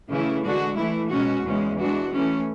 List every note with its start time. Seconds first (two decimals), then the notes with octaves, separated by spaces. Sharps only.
0.09 C#3 E3 A3 C#4 E4
0.44 D3 G#3 D4 F#4
0.77 E3 A3 E4
1.11 B2 G#3 C#4 F#4
1.44 E2 C#3 G#3 C#4
1.77 E3 G#3 D4 F#4
2.11 E3 A3 C#4